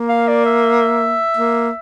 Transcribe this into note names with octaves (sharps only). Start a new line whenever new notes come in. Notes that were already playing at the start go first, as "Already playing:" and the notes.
Already playing: A#3
F5
D5
E5
A#3